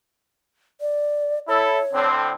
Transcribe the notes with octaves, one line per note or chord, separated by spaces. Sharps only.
D5
E4 A4 C#5
A2 D3 C4